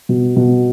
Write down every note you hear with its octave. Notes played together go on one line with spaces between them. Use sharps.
B2
B2